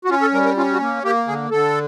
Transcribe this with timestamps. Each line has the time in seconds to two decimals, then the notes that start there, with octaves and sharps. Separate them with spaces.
0.05 F#4
0.10 C#4 F4
0.21 A4
0.33 G3 A#4
0.45 A#4
0.57 C#4 F4
0.73 F#4
0.80 A#3
1.03 A#3 G4
1.27 D3 G#4
1.51 D3 A4